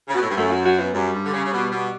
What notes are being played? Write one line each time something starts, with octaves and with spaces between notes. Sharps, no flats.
C#3
B2
A2
G2
F#2 A3
F#4
F#4
B3
F#2 G3
G2
D3
C#3
C#3
B2
B2